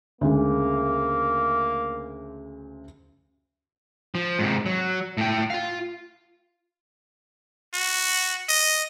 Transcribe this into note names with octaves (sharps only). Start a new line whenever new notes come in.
D2 C#3 G#3 A#3
F3
G#2 C3
F#3
A2 G5
F4 F5
F#4
D#5